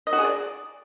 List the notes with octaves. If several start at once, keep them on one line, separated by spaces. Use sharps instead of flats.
D#5
F#4
G#4
D5